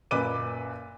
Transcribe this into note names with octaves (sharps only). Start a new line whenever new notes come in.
F#2 A#2 B4 D6 D#7